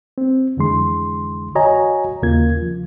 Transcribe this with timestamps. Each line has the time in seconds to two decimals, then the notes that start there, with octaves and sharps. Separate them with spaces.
0.18 C4
0.57 F2 D3 E3 G#3 C6
1.55 F#4 C#5 D#5 G#5 A#5
2.22 D#2 C#3 A#3 F4 G#6
2.62 F3